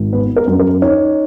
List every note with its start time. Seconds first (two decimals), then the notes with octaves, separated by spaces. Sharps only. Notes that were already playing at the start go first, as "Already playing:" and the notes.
Already playing: G#1
0.13 B3 B4
0.36 A#4
0.47 F#2
0.59 A#4
0.82 D#4 C#5